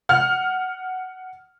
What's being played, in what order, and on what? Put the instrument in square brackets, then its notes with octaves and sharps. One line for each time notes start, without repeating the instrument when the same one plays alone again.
[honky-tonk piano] F#5 F6